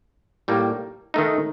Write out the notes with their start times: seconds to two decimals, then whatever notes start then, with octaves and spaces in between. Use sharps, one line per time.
0.48 A2 G3 A#3
1.14 D#3 A3 D#4